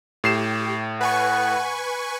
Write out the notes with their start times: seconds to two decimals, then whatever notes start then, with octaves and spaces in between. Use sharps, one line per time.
0.24 A2 G4 C7 E7
1.01 B4 F#5 G#5 C#6